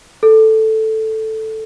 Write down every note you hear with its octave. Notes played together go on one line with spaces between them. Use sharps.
A4